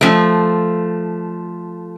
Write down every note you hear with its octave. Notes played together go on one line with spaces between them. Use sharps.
F3 A3